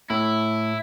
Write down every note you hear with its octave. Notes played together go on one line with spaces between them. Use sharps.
A2 E4 E5